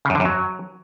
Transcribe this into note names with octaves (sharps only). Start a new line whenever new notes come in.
C#3
F#2
D3
F#2
F#3